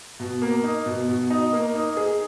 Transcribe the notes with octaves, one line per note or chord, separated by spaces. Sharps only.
B2
A#3
D#4
B2
B2
D#4
A#3
D#4
G#4